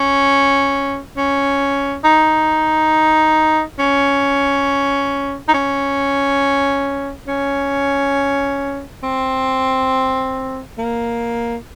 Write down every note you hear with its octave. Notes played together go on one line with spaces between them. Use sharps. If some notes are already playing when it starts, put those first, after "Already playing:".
Already playing: C#4
C#4
D#4
C#4
D#4
C#4
C#4
C4
A#3